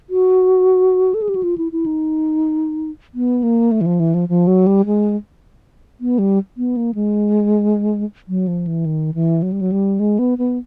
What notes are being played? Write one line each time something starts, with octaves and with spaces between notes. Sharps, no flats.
F#4
A4
G#4
G4
F#4
F4
E4
E4
D#4
B3
A#3
A3
E3
F3
E3
F3
F3
F#3
G3
G#3
B3
G3
B3
A#3
G#3
F#3
F3
E3
D#3
E3
F#3
G3
F#3
G3
G#3
B3
B3